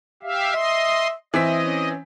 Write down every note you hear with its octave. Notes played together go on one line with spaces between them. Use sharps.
G4 E5 F5
D#5 E5 C6
E3 C4 D#5 E5 B6
C#4